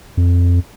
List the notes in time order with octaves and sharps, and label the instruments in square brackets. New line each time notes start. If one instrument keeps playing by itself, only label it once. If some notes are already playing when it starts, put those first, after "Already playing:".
[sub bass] F2